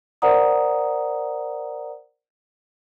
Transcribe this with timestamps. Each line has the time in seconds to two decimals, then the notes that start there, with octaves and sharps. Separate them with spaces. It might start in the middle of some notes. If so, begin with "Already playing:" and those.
0.22 A#4 C5 D5 F#5 A#5 D#6